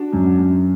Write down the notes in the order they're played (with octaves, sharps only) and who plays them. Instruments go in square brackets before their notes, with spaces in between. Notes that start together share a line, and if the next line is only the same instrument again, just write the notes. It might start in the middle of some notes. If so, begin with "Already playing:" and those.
Already playing: [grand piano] D4 F#4
F#2
F#2